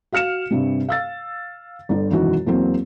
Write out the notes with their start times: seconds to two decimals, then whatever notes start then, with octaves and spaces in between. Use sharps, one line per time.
0.12 F#4 F5 F6 C#7 E7
0.51 G2 C3 G3
0.89 F5 E6 A6
1.89 G1 D3
2.10 E1 F#2 D#3 E3 F#4
2.46 E2 F#3 A#3 C4